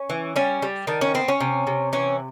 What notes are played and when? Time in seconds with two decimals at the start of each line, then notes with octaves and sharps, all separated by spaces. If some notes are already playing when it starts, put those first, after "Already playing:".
Already playing: C#4
0.10 E3
0.36 G3 C#4
0.62 G3
0.87 D#3 D4
1.01 C#4
1.14 B3 C4
1.28 C#4
1.40 C3
1.67 C3
1.93 E3 C#4